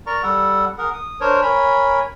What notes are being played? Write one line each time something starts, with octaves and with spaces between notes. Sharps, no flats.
A#4 D5 A#5 C#6
G3 A4 F#5
G#4 A#4 F#5
D#6
D4 A#4 C5 C#5
A#4 C#5 G#5 B5